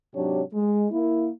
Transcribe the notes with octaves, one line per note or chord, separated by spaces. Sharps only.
G#2 C3 F#3 D4 G4 C#5
G#3
A#3 E4